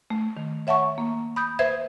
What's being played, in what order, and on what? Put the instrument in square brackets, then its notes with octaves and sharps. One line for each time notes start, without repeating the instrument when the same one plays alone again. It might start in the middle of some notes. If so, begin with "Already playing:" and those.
[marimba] A3
D#3
C#5 E5 F#5 A5 C#6
A#3
B5 D#6 G6
B4 C5 E5 G#6